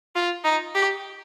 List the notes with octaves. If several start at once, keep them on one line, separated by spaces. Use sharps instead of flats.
F4
D#4
G4